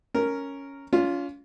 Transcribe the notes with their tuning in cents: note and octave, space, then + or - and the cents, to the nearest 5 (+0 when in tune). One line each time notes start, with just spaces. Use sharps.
C#4 +0 A#4 -5
C#4 +40 F4 +0